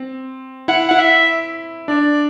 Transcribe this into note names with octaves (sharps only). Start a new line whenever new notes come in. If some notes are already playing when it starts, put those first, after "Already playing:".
Already playing: C4
E4 F#5
E4 F#5
E5
D4 D5